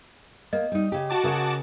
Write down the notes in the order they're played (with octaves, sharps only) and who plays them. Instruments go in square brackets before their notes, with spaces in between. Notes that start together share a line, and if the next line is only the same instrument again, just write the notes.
[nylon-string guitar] A#3 [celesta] D#5
[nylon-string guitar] G3 D#4
C#3 G4
[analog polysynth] F#4 A5 D6
[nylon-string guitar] C#3 A#4